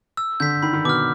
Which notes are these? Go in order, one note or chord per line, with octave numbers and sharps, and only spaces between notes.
E6
D3 G6 B6
D#3 B5
D#3
B2 D6 F6